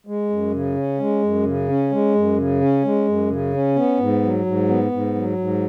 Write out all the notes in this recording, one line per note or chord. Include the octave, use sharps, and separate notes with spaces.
G#3
F#2
C#3
C#4
G#3
F#2
C#3
C#4
G#3
F#2
C#3
C#4
G#3
F#2
C#3
C#4
B3
G#2
F#3
G#2
B3
G#2
F#3
G#2